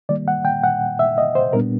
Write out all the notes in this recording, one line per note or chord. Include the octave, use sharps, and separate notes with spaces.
D#3 G3 A#3 D5
F#5
G5
F#5
E5
D#5
C5
A#2 G3 B3 D4 A#4